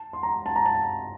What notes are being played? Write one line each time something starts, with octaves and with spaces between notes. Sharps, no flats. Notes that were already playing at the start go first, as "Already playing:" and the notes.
Already playing: A5
C6
A#5
A5
A#5
A5